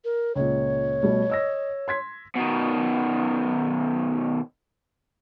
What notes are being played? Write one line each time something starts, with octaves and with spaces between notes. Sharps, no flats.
A#4
C#2 A#2 C#5
B2 G3 A3
D#5 E6 A#6
C6 G#6 B6
B2 D#3